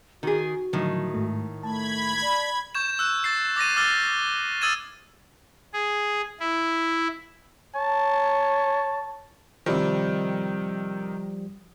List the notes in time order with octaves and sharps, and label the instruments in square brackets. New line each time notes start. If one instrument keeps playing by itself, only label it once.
[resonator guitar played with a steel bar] D#3 G#4 [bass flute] F#4
[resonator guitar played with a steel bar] A2 D#3 [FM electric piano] D3 F3 F#3
[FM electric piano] G#2 A3
[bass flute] A3 [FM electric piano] A5 [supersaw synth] B5 G#6
[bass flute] D5
[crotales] C#6 G6 G#6 E7
E6 F#6
A6 C7
D6 A6 A#6 D#7
D6 E6 F6 A6 G7
D#6 E6 G#6 A6 D#7 E7
[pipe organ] G#4
E4
[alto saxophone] C#5 [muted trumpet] A5
[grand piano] C3 D#3 [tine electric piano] F3 G3